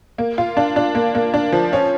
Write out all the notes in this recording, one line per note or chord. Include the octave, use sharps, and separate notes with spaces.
A#3
F4
D4
D4
A#3
A#3
D4
F3
C#4